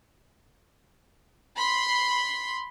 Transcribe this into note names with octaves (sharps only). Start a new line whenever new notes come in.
B5 C6